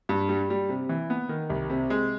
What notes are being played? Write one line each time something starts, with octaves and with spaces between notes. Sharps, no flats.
G2
G3
G3
C3
E3
B3
D#3
C2
C3
G#3